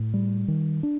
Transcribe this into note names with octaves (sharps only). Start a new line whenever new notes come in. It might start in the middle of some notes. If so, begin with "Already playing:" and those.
Already playing: A2
G3
D#3
D4